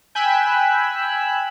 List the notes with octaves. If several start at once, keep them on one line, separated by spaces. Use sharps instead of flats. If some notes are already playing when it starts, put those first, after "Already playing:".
G5 G#5 B5 E6 F#6